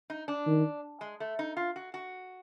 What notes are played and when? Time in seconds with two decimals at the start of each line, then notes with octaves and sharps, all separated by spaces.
0.10 D#4
0.28 D4
0.47 D#3
1.01 G#3
1.20 A3
1.39 D#4
1.57 F4
1.76 F#4
1.94 F#4